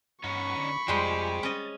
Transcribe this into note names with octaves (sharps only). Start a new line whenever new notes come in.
G2 C#4 D#4 F#5 B5 C#6
D3 D5
F2 G3 G#3 C4 F4 G4 C5 G#5
C#4 D#5 A6